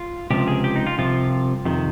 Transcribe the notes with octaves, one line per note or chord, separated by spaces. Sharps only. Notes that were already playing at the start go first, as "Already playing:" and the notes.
Already playing: F4
C#2 C3 F3 G4
G#4
G4
D#4
F4
C2 C3 F3 F4
F2 C3 D#3